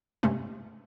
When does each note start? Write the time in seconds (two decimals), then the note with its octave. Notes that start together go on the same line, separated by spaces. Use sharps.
0.23 G2 C3 G#3 A3 C#4